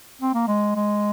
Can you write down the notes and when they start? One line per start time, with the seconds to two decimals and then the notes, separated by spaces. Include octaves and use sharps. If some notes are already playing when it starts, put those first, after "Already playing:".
0.22 C4
0.34 A#3
0.48 G#3
0.76 G#3